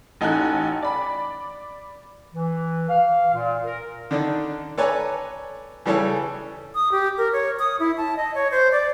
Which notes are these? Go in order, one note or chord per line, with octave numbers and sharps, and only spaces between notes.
A1 D#4 A4 G#5 F#6
D5 B5
E3
F5
A#2
A#4
D3 D#3 D4 D#4
A4 B4 C#5 D5 G#5 A#5
C#3 E3 G3 G#4 A4 C#5
D#6
G4
A#4
C#5
D#6
E4
A5
D#5
C#5
C5
D5